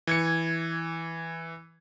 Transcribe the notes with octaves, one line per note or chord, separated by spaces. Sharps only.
E3 G#6 C#7